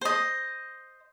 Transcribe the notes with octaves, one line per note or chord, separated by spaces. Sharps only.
C5 D#5